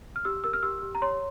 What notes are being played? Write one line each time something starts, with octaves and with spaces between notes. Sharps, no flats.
F6
G4 E6
A#4 E6
F6
G4 E6
G4
A#5
C#5 C6